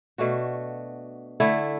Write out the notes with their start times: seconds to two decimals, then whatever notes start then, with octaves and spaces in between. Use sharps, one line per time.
0.18 B2 A3 D4 F#4
1.40 D3 A3 E4